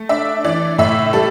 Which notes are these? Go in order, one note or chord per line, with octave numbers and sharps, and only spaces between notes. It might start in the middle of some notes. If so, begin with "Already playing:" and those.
Already playing: A3
D4 E5
E3 D5
A2 E5
G3 A4